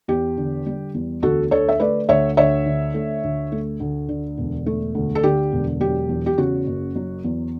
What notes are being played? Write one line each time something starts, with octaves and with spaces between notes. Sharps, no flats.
E2 G4
D3
G3
E2
D2 F#4 A4
D3 A4 C#5
E5
A3 B4 D5
D2 C#5 E5
D2 C#5 E5
D3
A3
D2
A3
D2
D3
E1
A3
D2
A4
D3 G4
E1
F#3 G4
E2
G4
C#3 F#4
F#1
F#3
E2